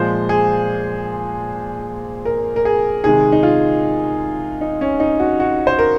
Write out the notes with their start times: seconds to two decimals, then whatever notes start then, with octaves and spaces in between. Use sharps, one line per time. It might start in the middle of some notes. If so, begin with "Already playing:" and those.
Already playing: A#2 F3 G#3 C5
0.29 G#4
2.25 A#4
2.56 A#4
2.65 G#4
3.04 C3 D#3 G#3 G#4
3.32 D#4
3.43 F4
4.61 D#4
4.81 C#4
5.00 D#4
5.20 F#4
5.40 F#4
5.67 C5
5.79 A#4